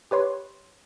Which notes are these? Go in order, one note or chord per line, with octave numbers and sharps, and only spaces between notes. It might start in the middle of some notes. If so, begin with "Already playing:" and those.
G4 B4 C#5 C6